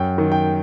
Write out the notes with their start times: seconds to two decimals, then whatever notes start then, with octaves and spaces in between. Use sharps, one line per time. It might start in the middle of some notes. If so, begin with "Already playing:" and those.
Already playing: F#2 G5
0.18 D#3
0.32 G5